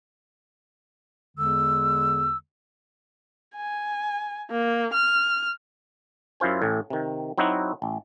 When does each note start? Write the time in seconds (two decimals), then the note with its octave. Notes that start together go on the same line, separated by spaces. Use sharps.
1.37 E2 D3 G#3 E6
3.56 G#5
4.51 A#3
4.94 F6
6.40 F#2 E4 F4 C5 G#5
6.62 A1 A2
6.90 C3 D#3
7.38 F#3 C4 D#4 E4 F#4
7.82 A1